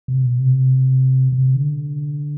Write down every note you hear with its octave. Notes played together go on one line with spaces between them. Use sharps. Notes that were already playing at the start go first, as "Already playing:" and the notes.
C3
B2
C3
C3
D3